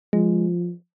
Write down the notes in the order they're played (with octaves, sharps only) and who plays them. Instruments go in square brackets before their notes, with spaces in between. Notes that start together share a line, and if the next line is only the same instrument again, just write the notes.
[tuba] F3 [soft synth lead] G#3